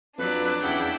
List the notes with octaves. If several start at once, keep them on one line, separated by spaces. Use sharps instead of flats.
F2 F#3 D4 B4 D5
E2 C#3 E4 F#5 G5